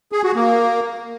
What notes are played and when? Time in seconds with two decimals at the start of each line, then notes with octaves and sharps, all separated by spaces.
0.12 G#4
0.24 F#4
0.35 A#3